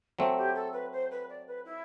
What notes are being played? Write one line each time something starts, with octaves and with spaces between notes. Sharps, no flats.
F#3 A3 C4 A4
G4
A4
B4
C5
B4
D5
B4
E4